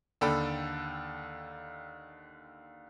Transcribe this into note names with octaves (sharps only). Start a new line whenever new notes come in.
D#2 D3 A4 G5 B5